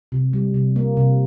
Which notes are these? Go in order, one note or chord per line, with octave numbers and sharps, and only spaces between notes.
C3
G3
C3
A#3
C3